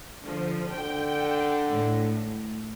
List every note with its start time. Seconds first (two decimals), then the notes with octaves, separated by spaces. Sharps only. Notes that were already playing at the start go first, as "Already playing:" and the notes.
0.25 D3 F3
0.72 D3 G5
1.69 A2